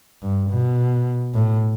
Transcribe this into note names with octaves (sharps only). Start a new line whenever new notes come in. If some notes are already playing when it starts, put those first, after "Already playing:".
G2
B2
A2